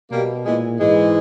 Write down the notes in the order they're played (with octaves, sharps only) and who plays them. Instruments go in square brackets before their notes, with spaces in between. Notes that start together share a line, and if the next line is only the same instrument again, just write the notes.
[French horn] B2 [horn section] G3 A#3
[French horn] A#2 [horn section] E3 G#3
[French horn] G#2 [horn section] E3 G#3